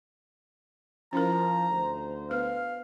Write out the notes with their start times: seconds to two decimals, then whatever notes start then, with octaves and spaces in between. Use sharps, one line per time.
1.13 F3 C#4 E4 A#4 A#5
1.70 D2 C5
2.31 B3 B4 F5